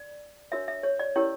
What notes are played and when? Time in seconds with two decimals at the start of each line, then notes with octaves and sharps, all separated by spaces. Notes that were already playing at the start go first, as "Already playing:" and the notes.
Already playing: D5
0.52 D4 F#4 A#4 C#5 E5
0.68 E5
0.83 C#5
0.99 D5
1.16 C#4 E4 G4 A#4 C#5